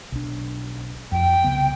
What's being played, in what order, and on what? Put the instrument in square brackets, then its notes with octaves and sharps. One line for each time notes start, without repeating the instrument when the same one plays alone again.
[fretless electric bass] B1 D4
[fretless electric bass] F2 [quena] G5
[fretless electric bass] C2 C#3 B3